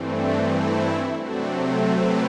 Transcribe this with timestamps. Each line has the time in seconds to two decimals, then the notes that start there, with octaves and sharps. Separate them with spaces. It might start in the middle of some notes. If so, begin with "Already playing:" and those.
Already playing: G2 E3 A3 C4
0.09 D4
0.46 E4
1.18 C3 F#3 A3 C4 D4 F#4
1.92 G4 B4